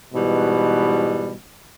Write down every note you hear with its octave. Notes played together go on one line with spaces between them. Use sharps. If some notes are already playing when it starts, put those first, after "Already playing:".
G#2 B2 E3 G3